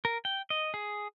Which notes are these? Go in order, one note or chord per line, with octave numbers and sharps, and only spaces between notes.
A#4
G5
D#5
G#4